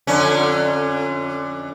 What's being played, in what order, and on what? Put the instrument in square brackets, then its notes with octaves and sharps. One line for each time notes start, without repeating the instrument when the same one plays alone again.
[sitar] F2 D3 C#4